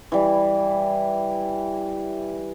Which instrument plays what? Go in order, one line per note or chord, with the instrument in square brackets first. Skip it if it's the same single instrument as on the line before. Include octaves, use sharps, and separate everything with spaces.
[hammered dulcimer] E3 G3